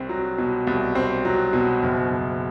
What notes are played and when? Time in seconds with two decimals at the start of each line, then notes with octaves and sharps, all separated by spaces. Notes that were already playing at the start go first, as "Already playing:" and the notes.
Already playing: C2 C4
0.09 F#3
0.38 B2
0.67 C2
0.95 C4
1.25 F#3
1.53 B2
1.83 F#1
2.11 F#1